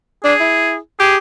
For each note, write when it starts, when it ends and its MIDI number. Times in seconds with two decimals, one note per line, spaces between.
0.24 0.34 62
0.24 0.75 68
0.40 0.77 64
1.00 1.17 67
1.00 1.16 68